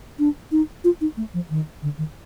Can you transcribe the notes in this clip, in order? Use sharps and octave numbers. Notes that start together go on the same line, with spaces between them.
D4
D#4
F4
D#4
A3
F3
D#3
D3
D#3